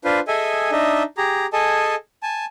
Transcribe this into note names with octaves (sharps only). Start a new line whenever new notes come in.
D4 F4 B4 C5
G#4 A4 D#5 E5 G#5
D4 D#4 D#5 E5
G4 G#4 A#5
G#4 A4 D#5 G#5 A5
G#5 A5